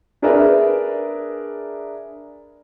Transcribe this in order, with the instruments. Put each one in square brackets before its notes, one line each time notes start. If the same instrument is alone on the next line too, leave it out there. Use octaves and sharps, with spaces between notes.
[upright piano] D4 G#4 A#4 B4 D5 E5